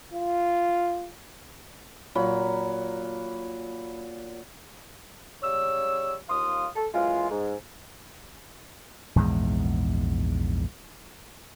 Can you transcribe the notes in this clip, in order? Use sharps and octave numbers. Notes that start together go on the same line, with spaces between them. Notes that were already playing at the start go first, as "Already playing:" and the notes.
F4
A#2 F#3 B5
C#3 G3 C#5 E6
D#2 F4 F5 C6 D#6
A4
F#2 E3 G#3 F4
G#2
A#1 E2 G#2 G#3